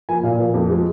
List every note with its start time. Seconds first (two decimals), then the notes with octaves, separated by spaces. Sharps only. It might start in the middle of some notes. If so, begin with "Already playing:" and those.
0.09 F3 A#3 G#5
0.23 A#2 F5
0.39 F3 A#3
0.54 F2
0.70 F3 G#3